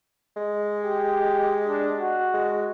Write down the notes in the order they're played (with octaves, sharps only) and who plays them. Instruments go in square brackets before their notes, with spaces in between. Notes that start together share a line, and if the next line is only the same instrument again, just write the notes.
[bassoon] G#3
[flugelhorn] G4
D4
F#4
[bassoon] G#3